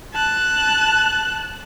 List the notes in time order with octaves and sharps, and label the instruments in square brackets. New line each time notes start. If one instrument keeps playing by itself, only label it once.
[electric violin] A5 F#6